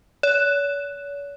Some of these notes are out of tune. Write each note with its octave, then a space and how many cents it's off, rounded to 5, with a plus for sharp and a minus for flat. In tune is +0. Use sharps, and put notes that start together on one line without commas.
C#5 +45